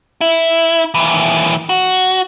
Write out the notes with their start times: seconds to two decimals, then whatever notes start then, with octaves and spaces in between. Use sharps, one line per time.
0.21 E4
0.94 D#2 E3
1.69 F#4